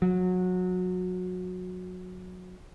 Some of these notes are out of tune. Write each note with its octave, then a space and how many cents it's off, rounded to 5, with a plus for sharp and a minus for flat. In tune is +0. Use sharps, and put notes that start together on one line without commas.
F#3 -20